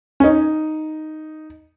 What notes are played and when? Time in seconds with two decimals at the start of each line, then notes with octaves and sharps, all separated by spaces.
0.20 C#4
0.24 D#4